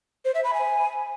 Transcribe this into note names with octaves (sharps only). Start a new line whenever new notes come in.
C5
E5
B5
G#5